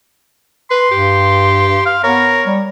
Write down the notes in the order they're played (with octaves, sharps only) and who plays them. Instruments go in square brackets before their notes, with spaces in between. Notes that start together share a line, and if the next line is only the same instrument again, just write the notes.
[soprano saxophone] B4 [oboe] C6
[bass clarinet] G2 [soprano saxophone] G4
[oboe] F5
[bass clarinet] B3 [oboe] A#4 [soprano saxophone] C#5
[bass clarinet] G3